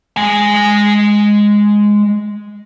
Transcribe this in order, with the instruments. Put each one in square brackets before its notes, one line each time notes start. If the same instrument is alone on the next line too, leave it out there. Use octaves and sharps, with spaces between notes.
[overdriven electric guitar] G#3 G#5